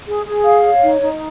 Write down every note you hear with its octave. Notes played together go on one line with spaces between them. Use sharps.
G#4
G#4
F5
C#5
D#4
D#4